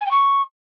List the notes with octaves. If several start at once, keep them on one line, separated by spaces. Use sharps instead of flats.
G#5
G5
C#6